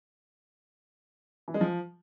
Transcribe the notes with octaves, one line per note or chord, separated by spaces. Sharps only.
E3
G#3
F3